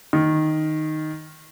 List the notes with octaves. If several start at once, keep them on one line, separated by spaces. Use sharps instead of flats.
D#3